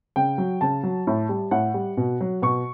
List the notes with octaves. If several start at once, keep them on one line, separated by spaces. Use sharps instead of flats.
C#3 G5
F#3
C#3 A5
F#3
A2
G3
A2 F#5
G3
B2
F#3
B2 C#6